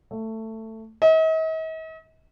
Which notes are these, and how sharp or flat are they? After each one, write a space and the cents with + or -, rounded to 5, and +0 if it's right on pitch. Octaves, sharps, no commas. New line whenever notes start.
A3 +15
D#5 +45